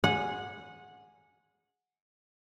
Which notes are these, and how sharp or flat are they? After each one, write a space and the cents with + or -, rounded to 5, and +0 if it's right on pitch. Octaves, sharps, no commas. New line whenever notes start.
G#4 +0 F#5 -20